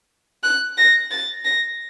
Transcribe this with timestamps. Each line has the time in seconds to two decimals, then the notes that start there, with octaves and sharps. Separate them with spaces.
0.43 F#6
0.77 A#6
1.11 A6
1.44 A#6